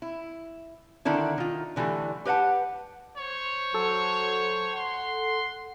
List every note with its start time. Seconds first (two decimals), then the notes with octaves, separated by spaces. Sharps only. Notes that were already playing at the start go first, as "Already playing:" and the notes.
0.02 E4
1.05 D3 D#3 D4 E4
1.38 D#3 F4
1.76 D3 E3 F#3 G3 A3
2.25 G4 B4 D#5 F#5 A5
3.17 C5 C#5
3.74 F#3 A4
4.74 F#5 C6